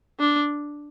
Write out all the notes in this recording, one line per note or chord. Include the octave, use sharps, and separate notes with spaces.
D4